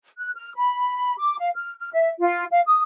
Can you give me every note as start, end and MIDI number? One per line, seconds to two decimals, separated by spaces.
0.18 0.30 90
0.36 0.51 89
0.55 1.14 83
1.17 1.38 86
1.39 1.49 77
1.55 1.73 89
1.79 1.89 89
1.93 2.09 76
2.20 2.44 65
2.51 2.60 77
2.66 2.82 87